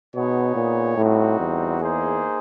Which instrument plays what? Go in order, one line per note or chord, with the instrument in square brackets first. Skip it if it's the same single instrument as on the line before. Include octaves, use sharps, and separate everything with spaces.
[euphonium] B2 [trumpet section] B3 D#4 G#4 C#5
[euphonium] A#2
[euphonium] A2 [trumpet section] G3 C4 D#4 F#4
[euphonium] E2
[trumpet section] A#3 D#4 G#4 C5